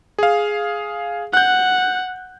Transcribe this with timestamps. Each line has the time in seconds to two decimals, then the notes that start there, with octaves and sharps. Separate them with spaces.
0.18 G#4 F5
1.33 F#5 F#6 G6